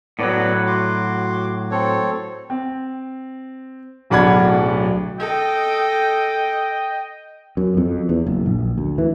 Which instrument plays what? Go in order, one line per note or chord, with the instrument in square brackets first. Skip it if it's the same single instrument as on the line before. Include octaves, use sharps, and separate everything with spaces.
[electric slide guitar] A2 F#3 [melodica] B3 D5
[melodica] F#4 C6 D6
C4 A4 C#5
[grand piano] C4
D1 B1 D4 F#5 B5 G#6
[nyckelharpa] A4 [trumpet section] D#5 G5
[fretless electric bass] F#2
F2
E2
F#1
A#1
D2
E3